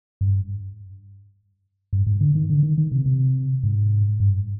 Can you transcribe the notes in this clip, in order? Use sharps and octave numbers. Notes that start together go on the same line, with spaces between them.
G2
G2
G#2
D3
D#3
D3
D#3
D#3
C3
C3
G#2
G2